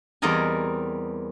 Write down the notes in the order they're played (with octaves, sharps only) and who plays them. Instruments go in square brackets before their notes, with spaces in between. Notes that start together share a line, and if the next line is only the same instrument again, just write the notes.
[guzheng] E2 G3 C4 A#4 D#5 G#5